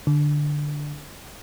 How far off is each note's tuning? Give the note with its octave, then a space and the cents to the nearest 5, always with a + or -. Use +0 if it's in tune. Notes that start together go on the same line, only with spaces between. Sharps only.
D3 +5